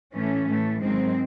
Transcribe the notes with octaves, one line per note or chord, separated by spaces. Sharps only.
A2 E3 A3 C#4
A2 E3 A3
G#2 D#3 F#3 G#3 C4